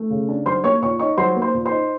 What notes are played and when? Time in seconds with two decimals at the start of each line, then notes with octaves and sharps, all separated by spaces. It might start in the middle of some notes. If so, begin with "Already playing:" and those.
Already playing: A3
0.10 C#3
0.29 D4
0.46 F#3 C5 C6
0.64 A#3 C#5 C#6
0.82 A#2 C#5 C#6
0.99 D#4 C#5 C#6
1.18 F#3 C5 C6
1.36 A#3
1.42 C5 C6
1.54 A#2
1.65 C5 C6
1.71 D#4